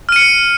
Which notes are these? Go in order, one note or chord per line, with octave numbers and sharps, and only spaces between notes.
F6 C#7 D#7